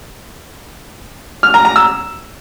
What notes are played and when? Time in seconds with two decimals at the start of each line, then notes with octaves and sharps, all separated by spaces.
1.43 F6
1.54 A#5
1.65 A#5
1.76 E6